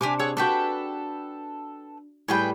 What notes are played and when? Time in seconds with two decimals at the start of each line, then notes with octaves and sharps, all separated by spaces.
0.01 C3 D4 G4 G#5 D6
0.19 G#4 C#5 F#5 E6
0.37 D4 F#4 A4 B4 G5
2.28 A2 G3 E4 G#4 B4 G5